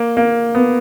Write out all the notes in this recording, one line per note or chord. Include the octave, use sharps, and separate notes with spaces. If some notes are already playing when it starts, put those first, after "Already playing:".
Already playing: A#3
A#3
B3